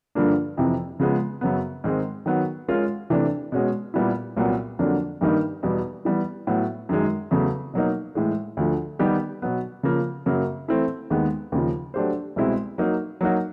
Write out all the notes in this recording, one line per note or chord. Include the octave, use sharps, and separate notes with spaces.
G2 D3 F3 A#3 D4
F2 C3 E3
C#3 F3 G#3 B3
F#2 C#3 F#3 B3
G#2 D#3 G#3 C4
D#3 F#3 B3
G#3 C#4 F4 A#4
C3 E3 A3 D4
B2 G#3 C#4 F#4
A#2 G3 B3 E4
C2 A#2 F#3 B3
F2 D3 F#3 A#3 D4
G2 D#3 G3 A#3 D#4
E2 B2 G3 B3
E3 G3 B3
A2 F#3 B3
F#2 D#3 G#3
E2 C#3 F#3 A3
B2 F#3 A#3 D#4
A2 E3 G#3
D2 D3 F3
D#3 G3 B3 D#4 G4
B2 F#3 B3
C#3 F3 A#3
F#2 C#3 F#3 A#3
E3 A3 C4 E4 A4
D#2 D#3 G#3 B3
D#2 C#3 F3
F#3 A3 D4 G4 C5
C2 B2 G#3 C4 E4
F#3 A#3 D#4
F#3 A#3 D#4 F#4